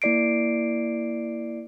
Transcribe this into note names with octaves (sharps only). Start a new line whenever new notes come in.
A#3 E4 D5 C7 D7